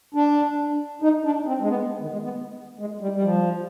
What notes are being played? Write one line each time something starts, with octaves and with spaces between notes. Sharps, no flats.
D4
D#4
D4
C4
G#3
B3
D#3
G#3
B3
G#3
G3
G3
F3